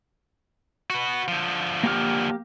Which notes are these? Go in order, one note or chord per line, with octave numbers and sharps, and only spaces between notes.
F#4 B4
D3 F3
A#3 G4 F6